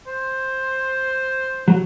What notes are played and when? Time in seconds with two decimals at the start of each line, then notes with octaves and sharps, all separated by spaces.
0.06 C5
1.68 F#3